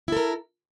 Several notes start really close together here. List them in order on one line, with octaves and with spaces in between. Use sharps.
E4 A4 A#4